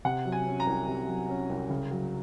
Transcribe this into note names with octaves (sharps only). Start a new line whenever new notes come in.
C3 F#5
F#3
G#5
C#4
A#5
C2
C3
F#3
C#4
C2
C#3
F#3